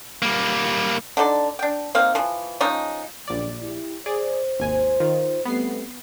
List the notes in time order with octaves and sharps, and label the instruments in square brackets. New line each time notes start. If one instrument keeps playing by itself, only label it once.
[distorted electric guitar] G3 A#3
[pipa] D3 D#4 A4 D5
D4 G5
A#3 C4 D#4 F5
E3 F3
F3 G#3 C#4 D#4
[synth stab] A#1 D5 [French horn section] F#2 C#3 G3
[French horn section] E4 G4
[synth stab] G#4 D5 [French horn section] C5
[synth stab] G#1 D#2 G#5
D#3 F4
[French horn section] G3 A3 C4 [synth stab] B3 C7